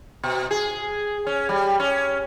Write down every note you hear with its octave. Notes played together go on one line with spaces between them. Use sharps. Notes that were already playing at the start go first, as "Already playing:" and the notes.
B2
G#4
C#4
G3
C#4